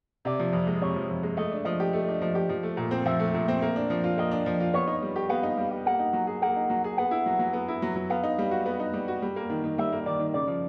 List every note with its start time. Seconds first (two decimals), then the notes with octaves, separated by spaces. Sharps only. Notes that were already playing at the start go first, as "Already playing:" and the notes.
0.25 C3 D5
0.40 F3
0.53 F2
0.67 G#3
0.81 C3 C#5
0.95 F3
1.10 F2
1.23 G#3
1.37 A3 D#5
1.52 D4
1.65 F3 D#5
1.80 G4
1.93 A3
2.08 D4
2.21 F3
2.35 G4
2.49 F3
2.63 A3
2.77 A#2
2.91 C4
3.06 F3 E5
3.20 A3
3.34 A#2
3.48 C4
3.62 A#3
3.76 D4
3.90 F3
4.04 F4
4.18 A#3 D#5
4.31 D4
4.46 F3
4.60 F4
4.74 B3 C#5
4.87 D#4
5.02 G3
5.16 G4
5.29 B3 F5
5.43 D#4
5.57 G3
5.71 G4
5.86 A#3 F#5
6.00 D#4
6.13 F#3
6.27 G#4
6.42 A#3 F#5
6.56 D#4
6.70 F#3
6.84 G#4
6.97 B3 F#5
7.11 E4
7.26 F#3
7.39 F#3
7.53 B3
7.68 E4
7.82 F#3
7.96 F#3
8.10 B3 F5
8.24 D#4
8.38 G3
8.51 F#4
8.66 B3
8.80 D#4
8.93 G3
9.08 F#4
9.22 G3
9.36 A#3
9.50 D#3
9.64 D#3
9.78 G3 E5
9.92 A#3
10.06 D#3 D5
10.19 D#3
10.34 C#3 D5
10.47 F3